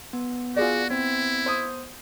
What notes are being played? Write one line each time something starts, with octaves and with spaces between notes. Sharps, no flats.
B3
F4 F#4 G#4 D5
C4 E4
C5 D#6